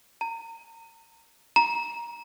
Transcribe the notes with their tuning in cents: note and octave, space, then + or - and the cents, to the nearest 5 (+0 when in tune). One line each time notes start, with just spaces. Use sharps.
A#5 -30
A#5 +15